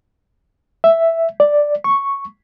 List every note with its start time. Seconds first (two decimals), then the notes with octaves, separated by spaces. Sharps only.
0.84 E5
1.40 D5
1.84 C#6